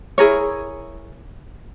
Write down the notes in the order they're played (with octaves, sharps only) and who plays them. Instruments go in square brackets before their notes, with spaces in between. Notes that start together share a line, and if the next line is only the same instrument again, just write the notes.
[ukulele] E4 G#4 A#4 C#5